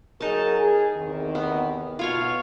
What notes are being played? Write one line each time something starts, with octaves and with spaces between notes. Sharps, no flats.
F#3 D#4 G#4 A#4 A5
G#4
E2 C3 D#3
B3
B2 F4 C#5 F5